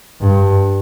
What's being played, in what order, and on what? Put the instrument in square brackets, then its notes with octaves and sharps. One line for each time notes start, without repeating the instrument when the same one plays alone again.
[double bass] G2